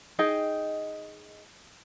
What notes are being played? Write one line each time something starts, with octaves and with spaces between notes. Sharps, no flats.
D#4 G#4 D#5 G5